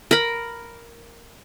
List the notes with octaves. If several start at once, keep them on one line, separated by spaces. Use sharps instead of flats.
A#4 B5